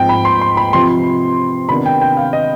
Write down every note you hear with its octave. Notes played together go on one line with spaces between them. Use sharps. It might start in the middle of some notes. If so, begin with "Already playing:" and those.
Already playing: G#2 F3 C4 G5
B5
C6
C6
B5
C3 F3 C4 C6
C3 D#3 B3 D4 B5
G5
G5
F5
D#5